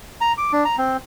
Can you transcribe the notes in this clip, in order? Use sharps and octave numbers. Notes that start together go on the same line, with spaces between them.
A#5
D6
D4
A#5
C4